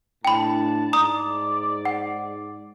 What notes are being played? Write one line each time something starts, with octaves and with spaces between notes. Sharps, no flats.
A2 D4 G5 A5 B5
G#2 D5 A#5 D#6
F#5